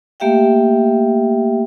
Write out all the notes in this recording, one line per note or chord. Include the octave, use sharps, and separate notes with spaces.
A3 A#3 G4 E5 F5 G5